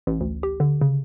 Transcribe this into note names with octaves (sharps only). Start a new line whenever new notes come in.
A1
D2
G4
D3
C#3